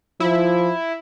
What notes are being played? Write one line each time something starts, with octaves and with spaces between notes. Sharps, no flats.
F3 E4